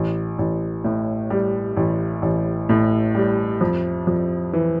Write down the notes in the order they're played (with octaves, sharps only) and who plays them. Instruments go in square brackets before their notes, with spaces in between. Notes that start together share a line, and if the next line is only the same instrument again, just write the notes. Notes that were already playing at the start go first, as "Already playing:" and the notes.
Already playing: [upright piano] A1
A1
A2
G3
A1
A1
A2
G3
F2
F2
E3